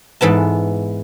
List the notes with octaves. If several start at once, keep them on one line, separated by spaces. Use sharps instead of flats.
G#2 E3 B3 A5